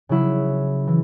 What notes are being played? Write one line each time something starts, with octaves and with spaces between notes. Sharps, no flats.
C#3 F#3 E4
E3